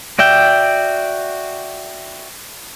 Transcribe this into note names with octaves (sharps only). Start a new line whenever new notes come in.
F#4 D5 E5 G5